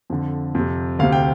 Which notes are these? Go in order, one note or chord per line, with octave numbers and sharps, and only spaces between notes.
F2 D3
F2 C3
D2 C3 F5
G5